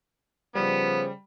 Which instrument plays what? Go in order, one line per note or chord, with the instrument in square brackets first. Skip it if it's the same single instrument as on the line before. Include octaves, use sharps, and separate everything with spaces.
[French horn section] C#3 F3 C5 [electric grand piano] G3 [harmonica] B3